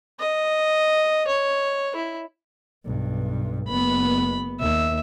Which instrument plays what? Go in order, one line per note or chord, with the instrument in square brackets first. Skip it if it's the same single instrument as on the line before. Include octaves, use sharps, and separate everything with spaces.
[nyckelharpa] D#5
C#5
E4
[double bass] B1 G2
[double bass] F#1 B3 [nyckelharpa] B5
[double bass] D#2 [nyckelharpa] E5